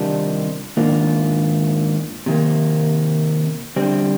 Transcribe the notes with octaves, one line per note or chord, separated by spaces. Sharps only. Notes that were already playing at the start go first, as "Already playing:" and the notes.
Already playing: C3 D#3 G3 D4 F4
G#2 D#3 A#3 D4 F4
C3 D#3 A#3
D3 G3 C4